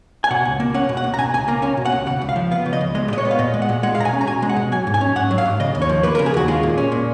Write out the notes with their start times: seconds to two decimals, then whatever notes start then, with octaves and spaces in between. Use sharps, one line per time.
0.24 G#5
0.31 B2 F#5
0.45 C#2
0.60 A#3
0.74 C#4 F#5
0.89 B2
0.97 F#5
1.04 C#2
1.14 A#5
1.18 B2 G#5
1.34 C#2 G#5
1.48 A#3 A#5
1.62 C#4 G#5
1.77 B2
1.85 F#5
1.92 C#2
2.07 C#3 F#5
2.21 C#2
2.29 F5
2.36 F3
2.51 B3 F5
2.66 C#3
2.73 D#5
2.81 C#2
2.95 G#3 D#5
3.10 A#2 D#5
3.18 C#5
3.25 B3
3.31 F5
3.39 A#2 D#5
3.54 G#3
3.62 F#5
3.69 A#2
3.83 G#3 F#5
3.95 F5
3.98 B2 A#5
4.05 G#5
4.13 C#4
4.21 A#5
4.27 B2 G#5
4.42 G#3
4.49 F#5
4.56 B2
4.72 F#3 G#5
4.87 G#2
4.94 G#5
5.01 C#4
5.16 G#2 F#5
5.31 F#3
5.38 F5
5.46 G#2
5.60 C#3 D#5
5.75 D#2
5.82 C#5
5.89 F3
6.03 A#3 B4
6.15 A#4
6.19 C#3
6.26 G#4
6.34 D#2 F#4
6.48 G#3 F4
6.63 A#2
6.78 C#4
6.92 A#2